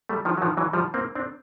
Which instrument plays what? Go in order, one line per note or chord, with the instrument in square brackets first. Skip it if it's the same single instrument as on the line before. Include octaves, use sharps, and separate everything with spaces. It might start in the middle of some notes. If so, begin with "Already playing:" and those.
[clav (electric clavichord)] G3 A3
D#3 F3
F#3
D#3 F3
E3 F#3
F3 G3
A#3 C4
C4 D4